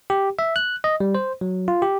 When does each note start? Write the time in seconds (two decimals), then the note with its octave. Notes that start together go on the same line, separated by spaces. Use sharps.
0.10 G4
0.39 E5
0.56 F#6
0.84 D#5
1.00 G3
1.15 C5
1.41 F#3
1.68 F4
1.82 G4